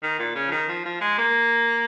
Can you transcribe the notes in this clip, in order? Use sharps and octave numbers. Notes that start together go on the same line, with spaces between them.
D#3
A#2
C#3
F3
D#3
F3
F3
G#3
A#3